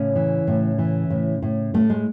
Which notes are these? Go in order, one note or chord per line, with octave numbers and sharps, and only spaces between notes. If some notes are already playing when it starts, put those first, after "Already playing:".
Already playing: A2 C#3 C#4
E3
A2
E3
A2
A2
A2 A3
G#3